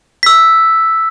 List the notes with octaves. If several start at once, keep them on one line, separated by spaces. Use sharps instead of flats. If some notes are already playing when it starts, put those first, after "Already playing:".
E6 B6